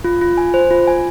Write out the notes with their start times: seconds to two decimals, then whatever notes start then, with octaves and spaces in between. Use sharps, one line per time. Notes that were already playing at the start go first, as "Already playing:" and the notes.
0.04 F4
0.21 F4
0.38 G#5
0.54 C5
0.71 F4
0.87 G#5